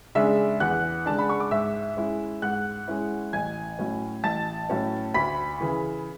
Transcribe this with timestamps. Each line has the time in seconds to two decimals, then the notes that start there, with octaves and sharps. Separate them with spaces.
0.15 C#3 G#3 D4 E5 E6
0.60 E2 F#5 F#6
1.06 C#3 G#3 D4 A5
1.18 B5
1.29 C#6
1.40 D6
1.51 G#2 E5 E6
1.97 G#3 C#4 E4
2.42 G#2 F#5 F#6
2.87 G#3 C#4 E4
3.33 A1 G#5 G#6
3.79 A2 F#3 C#4
4.24 A1 A5 A6
4.70 A2 F#3 C#4
5.14 D2 B5 B6
5.61 C#3 E3